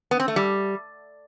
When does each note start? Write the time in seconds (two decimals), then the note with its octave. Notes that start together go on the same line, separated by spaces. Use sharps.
0.11 B3
0.20 C4
0.28 A3
0.36 G3